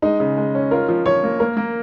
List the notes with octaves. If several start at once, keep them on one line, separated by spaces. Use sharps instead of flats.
G#3 D#4
C#3
G#3
C#4
F4 A#4
F3
F3 C#5
A#3
A#3 A#4
A#3